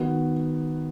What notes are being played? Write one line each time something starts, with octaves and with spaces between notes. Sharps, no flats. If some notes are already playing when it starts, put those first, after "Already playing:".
Already playing: D#3 B3 F#4